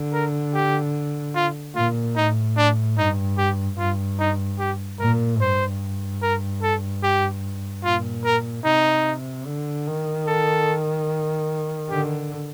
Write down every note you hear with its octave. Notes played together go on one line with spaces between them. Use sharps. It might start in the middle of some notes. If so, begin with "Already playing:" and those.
Already playing: D3
A#4
G4
F4
A#2 F4
A2 D#4
D4
G2 D#4
G4
G2 F4
D#4
G4
A#2 A#4
G2 C5
A#4
A4
G4
A#2 F4
A#4
C3 D#4
D3
D#3
A4
D3 G4